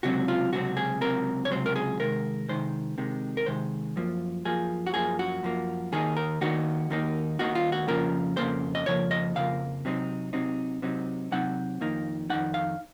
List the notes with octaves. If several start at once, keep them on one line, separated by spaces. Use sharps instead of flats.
C#2 C3 F#3 C4 F#4
F4
C#2 C3 F#3 C4 F#4
G#4
C#2 C3 F#3 C4 A#4
C#5
C#2 C3 F#3 C4 C5
A#4
G#4
C3 D#3 G#3 A#4
C3 D#3 G#3 C5
C3 D#3 G#3
A#4
C3 D#3 G#3 C5
F#2 F3 A#3
F#2 F3 A#3 G#4
F#4
F#2 F3 A#3 G#4
F#4
F#2 F3 A#3
D#2 D#3 A#3 D#4 G#4
A#4
D#2 D#3 A#3 D#4 F#4
D#2 D#3 A#3 D#4
D#2 D#3 A#3 D#4 F#4
F4
F#4
F2 C#3 F3 A#3 A#4
F2 C#3 F3 A#3 C5
D#5
F2 C#3 F3 A#3 C#5
D#5
F2 C#3 F3 A#3 F5
C3 F#3 C4 D#4
C3 F#3 C4 D#4
C3 F#3 C4 D#4
C3 F#3 C4 D#4 F#5
F2 D#3 A#3 D#4
F2 D#3 A#3 D#4 F#5
F5